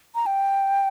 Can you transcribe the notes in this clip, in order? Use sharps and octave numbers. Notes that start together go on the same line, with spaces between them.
A#5
G5